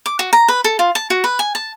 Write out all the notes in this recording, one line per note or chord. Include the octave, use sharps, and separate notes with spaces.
D6
F#4
A#5
B4
A4
F4
A5
F#4
B4
G#5
A5